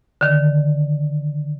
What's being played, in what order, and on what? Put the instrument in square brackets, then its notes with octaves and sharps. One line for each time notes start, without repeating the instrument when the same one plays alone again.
[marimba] D3 D#3